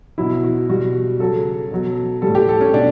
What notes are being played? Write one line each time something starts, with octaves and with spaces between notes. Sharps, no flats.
B2 F#3 E4
F#4
B2 G3 F#4
C#3 F#3 A4
B2 F#3
G3 A4
A2
G4
A4
C#4
B2 D4